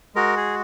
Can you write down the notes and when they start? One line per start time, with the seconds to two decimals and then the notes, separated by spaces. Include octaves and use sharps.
0.15 G#3 F#4 A#4
0.37 G#4